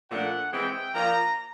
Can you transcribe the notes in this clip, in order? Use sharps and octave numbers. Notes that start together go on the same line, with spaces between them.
A#2 F3 A3 D4 F#5
E3 G#3 C4 E4 G5
F3 A#3 D4 F4 A#5